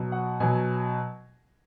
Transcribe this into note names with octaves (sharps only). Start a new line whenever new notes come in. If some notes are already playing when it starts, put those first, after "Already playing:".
Already playing: B2 F#3
F#5
B2 F#3 G#5